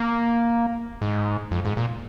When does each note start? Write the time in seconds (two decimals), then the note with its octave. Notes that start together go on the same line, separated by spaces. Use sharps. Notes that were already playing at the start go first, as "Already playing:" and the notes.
Already playing: A#3
1.02 G#2
1.51 F2
1.65 G#2
1.77 A#2